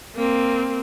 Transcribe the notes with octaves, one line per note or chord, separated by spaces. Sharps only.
A#3 C4